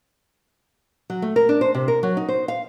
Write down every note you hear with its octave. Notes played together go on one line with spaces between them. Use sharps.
F#3
A3
A#4
D4
C5
C3
A#4
F#3
D#4
C5
F5